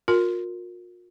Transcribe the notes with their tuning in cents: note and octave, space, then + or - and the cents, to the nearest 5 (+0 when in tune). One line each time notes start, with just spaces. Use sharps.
F4 +45 A#4 +0